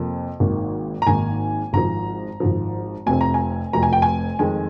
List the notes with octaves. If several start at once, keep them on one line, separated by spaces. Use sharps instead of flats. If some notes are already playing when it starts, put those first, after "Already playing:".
Already playing: F2 C3 F3 A#3
G#1 G#2 D#3 A#3
A#5
G#1 G#2 D#3 A#3 G#5
G#1 G#2 F3 A#5
G#1 G#2 F3
F1 F2 C3 F3 G#5
A#5
G#5
F1 F2 C3 F3 A#5
G#5
G5
G#5
F2 D#3 G#3 G#5